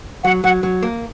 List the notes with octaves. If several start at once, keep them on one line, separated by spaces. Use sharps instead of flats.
F#3 F#5
F#3 F#5
F#3
A#3